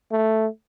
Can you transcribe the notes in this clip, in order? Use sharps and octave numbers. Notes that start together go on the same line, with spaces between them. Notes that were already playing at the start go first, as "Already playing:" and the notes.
A3